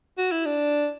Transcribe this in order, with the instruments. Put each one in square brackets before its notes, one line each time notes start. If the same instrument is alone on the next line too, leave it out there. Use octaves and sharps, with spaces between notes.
[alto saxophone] F#4
E4
D4